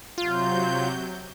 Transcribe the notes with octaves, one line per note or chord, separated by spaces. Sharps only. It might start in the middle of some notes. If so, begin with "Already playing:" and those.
C3 F#3 F4 G6